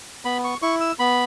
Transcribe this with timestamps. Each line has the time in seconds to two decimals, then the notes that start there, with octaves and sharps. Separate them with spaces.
0.25 B3 B5
0.44 C#6
0.62 E4 C#6
0.80 E6
0.99 B3 B5